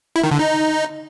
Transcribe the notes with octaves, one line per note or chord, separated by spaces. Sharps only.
E4
D#3
D3
D#4